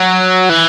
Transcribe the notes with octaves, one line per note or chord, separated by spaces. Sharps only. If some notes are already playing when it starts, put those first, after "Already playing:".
Already playing: F#3
E3